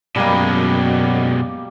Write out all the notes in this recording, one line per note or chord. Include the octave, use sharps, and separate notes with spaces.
F#2 B2 G3 G#3 A#3